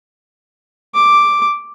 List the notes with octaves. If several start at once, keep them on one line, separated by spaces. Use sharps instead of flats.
D6